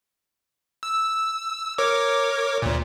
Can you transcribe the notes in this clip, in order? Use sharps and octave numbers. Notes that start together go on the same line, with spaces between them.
E6
A#4 C#5 D6
D2 A#2